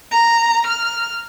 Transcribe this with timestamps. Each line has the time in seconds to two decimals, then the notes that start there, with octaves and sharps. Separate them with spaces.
0.12 A#5
0.67 F6